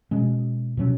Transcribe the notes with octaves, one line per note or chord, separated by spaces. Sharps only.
B2 G#3 C#4
B2 F#3 C#4